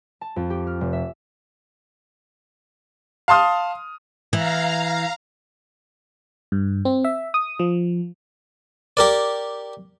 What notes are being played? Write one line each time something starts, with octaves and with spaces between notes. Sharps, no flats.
A5
F2
G4
F6
F1
E5
F5 A5 C6 D#6 F6
E3 F5 A#5
G2
C4
E5
D#6
F3
G4 A#4 D5